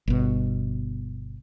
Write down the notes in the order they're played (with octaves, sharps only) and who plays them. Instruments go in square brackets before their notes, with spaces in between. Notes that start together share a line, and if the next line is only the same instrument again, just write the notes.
[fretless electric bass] G1 B2